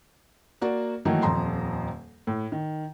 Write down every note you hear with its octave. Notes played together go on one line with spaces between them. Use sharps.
A#3 F#4 D5
D#3 E3 F#3 A3 A#3 D#4
D#1 F2 A#5 C6
A2
D#3